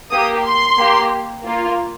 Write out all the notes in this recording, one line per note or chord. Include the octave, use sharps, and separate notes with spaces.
A#3 G4 D#6
C6
A#3 G4
A#3 F4